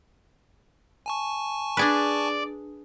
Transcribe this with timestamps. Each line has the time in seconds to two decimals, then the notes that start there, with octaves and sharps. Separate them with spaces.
1.06 G#5 A5 C#6
1.77 D4 G#4 B4 D5